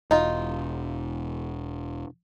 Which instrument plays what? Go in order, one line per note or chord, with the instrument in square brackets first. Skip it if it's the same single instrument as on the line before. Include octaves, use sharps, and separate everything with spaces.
[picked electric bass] E1 [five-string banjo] D#4 F4 [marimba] D#5